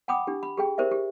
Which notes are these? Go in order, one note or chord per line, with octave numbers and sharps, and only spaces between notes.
F#5 G5 B5 D6 D#6
D4 G4
B5
G4 G#4 G5
G4 A#4 C5 D5 E5
G4